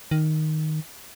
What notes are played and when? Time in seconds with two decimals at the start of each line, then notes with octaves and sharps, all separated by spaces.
0.11 D#3